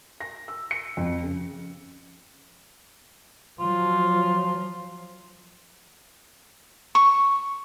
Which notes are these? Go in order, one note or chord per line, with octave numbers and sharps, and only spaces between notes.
A#6
E6
C#7
F2
C#3
F3 F#3 F4
C#6